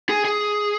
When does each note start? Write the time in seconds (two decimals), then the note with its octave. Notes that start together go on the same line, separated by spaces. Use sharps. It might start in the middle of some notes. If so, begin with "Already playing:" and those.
0.09 G#4
0.25 G#4